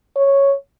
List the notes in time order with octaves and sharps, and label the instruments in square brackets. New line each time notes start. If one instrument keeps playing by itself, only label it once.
[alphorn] C#5